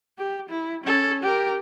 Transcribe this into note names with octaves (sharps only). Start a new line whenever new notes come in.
G4
E4
C#4 A4
G4 A#4